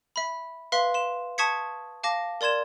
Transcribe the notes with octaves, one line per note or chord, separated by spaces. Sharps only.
E5 B5
B4 E5 F5 C6
C6 E7
A5 C#6 D#6 G#6 B6 C#7
F5 A5 D6 A#6
A#4 D5 C6 G#6 E7